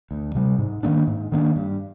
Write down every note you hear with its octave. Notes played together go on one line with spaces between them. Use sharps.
D2
C3 G3
G#2
D#3 A#3 D4
G#2
D#3 A#3 D4
G2